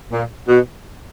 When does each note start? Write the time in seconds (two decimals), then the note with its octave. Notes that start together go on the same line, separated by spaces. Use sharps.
0.12 A#2
0.48 B2